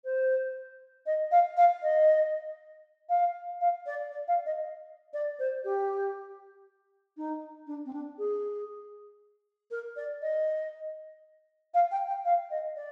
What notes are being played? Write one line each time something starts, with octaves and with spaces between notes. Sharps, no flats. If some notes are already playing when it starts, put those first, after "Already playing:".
C5
D#5
F5
F5
D#5
F5
F5
D5
D5
F5
D#5
D5
C5
G4
D#4
D4
C4
D4
G#4
A#4
D5
D#5
F5
G5
G5
F5
D#5
D5